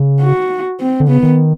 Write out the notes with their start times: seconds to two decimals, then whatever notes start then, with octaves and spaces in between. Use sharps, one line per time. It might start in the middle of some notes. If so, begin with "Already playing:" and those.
Already playing: C#3
0.21 F#4
0.80 C4
1.00 D3
1.08 C#3 B3
1.23 D#3